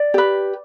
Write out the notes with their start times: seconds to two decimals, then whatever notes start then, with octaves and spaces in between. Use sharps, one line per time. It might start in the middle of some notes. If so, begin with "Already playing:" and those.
Already playing: D5
0.14 G4 B4